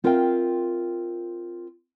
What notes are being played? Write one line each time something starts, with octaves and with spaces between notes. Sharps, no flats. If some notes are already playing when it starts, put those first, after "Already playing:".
C4 F4 A#4 E5 F5 G5